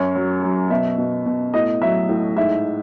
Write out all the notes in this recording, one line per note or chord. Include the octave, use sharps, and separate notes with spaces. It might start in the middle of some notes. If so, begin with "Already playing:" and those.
Already playing: F#2 C#5
F#3
F#3
B2 E5
B2
B2
A2 D#5
F#3 E5
A2
G#2 E5